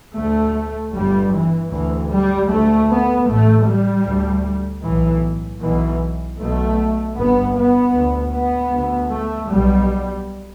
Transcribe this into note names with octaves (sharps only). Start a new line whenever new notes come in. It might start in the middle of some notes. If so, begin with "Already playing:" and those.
D2 A3
G1 G2 G3
E3
D2 E3
G3
D2 A3
B3
A1 A2 A3
G3
D2
B1 A2 E3
B1 B2 E3
B1 B2 A3
G1 G2 B3
B3
D2
B3
D2
A3
B1 B2 G3